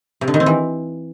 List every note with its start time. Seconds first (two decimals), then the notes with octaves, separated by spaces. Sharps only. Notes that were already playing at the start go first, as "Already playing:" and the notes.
0.21 C3
0.28 D3
0.34 D#3
0.40 C4
0.46 E3